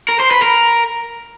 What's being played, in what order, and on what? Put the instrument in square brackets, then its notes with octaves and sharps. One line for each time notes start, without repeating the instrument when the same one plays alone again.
[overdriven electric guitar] A#4
C5
B4
A#4